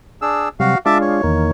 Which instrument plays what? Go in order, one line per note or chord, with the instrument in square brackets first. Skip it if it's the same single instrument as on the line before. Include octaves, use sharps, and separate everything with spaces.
[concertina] D4 G#4 E6
[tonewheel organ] C3 F#3 G3 [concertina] F#4 F5
[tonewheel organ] G#3 D4 F4 [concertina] E5 A5 D6
[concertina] C#5
[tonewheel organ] E2 D#3 A#3